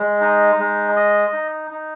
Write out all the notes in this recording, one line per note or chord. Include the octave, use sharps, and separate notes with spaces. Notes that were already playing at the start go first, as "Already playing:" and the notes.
Already playing: G#3
D#4
G#3
D#5
D#4
D#4